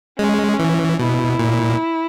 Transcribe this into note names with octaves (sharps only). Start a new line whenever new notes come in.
G#3 C#4
E3
B2 E4
A#2